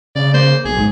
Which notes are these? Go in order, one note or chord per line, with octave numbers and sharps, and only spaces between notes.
C#3 D5
A#3 C5
B1 G#4
G#2